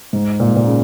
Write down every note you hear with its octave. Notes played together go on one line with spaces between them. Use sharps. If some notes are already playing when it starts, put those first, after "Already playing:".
G#2
A#2
G#2
A#2
C#3